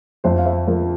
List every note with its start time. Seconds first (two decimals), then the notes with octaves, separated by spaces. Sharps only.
0.24 F2 C5 E5
0.38 F5
0.46 C5 E5
0.67 F3 A#4